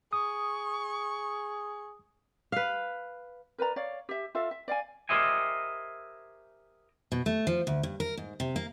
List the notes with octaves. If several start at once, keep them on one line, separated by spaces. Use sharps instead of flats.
G#4 C#6 D#6
B4 F5
A#4 B4 D5 A#5
C#5 D5 F5
G4 E5
F4 A4 E5 F5
E5
D5 F5 F#5 G#5
G4 A#4 C5 D#5 E5 G#5
B2
A3
F3
D2
G2
A#4
G#2
C3
A#3